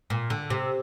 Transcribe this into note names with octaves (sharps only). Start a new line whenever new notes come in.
A#2
D3
C3